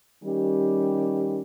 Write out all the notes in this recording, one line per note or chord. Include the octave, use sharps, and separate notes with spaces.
D#3 G3 C#4 G4